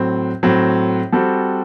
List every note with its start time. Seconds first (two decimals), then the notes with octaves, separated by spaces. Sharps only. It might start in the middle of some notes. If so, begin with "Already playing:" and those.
Already playing: A2 F#3 C4
0.43 A2 F#3 C4
1.12 G3 C4 F#4 A4